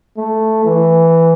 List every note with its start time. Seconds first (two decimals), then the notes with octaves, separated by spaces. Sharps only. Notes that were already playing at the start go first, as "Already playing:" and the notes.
0.17 A3
0.65 E3